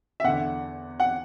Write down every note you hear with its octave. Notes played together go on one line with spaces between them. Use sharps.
E5
E2 D3 F#5
F#5